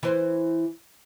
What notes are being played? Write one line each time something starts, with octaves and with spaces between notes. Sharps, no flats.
E3 C5